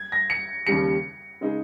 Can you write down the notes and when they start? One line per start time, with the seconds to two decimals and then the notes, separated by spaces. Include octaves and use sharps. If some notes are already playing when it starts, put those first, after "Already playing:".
Already playing: G#6
0.12 A#6
0.30 C#7
0.67 D#2 C#3 G3 C#7
1.41 C#3 G#3 D#4 G#4